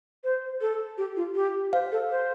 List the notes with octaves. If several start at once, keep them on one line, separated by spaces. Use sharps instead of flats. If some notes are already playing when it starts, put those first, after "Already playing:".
C5
A4
G4
F4
G4
C5 F5
A4
C5